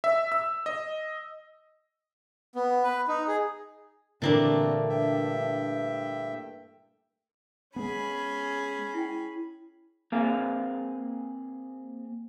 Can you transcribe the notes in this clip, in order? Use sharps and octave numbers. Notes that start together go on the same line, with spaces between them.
E5
E6
D#5
B3
B4
D#4
G#4
A#2 D3 E3 G3 A3 A#3 C4 D4
G2 E5 G5
G#3 B3 C#4 G#4 B5
E4 G5
A#3 C4 G#4 F5